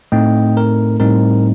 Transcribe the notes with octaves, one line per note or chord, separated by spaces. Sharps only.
A2 A3 C4 D#4 D#5 G5
A#4
A2 G3 C4 D#4 A#4